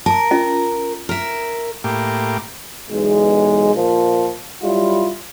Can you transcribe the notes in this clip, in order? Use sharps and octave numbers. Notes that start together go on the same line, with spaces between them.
A#4 A5 A#5
C#4 F4 D#5
A#4 E5
A2 A#3 G4
B1 E2 G#3
A#2 F3
F#3 G3 E4 F4